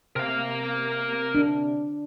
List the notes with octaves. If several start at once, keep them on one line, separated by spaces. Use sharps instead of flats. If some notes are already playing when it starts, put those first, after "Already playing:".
C3 A#4 F5
D4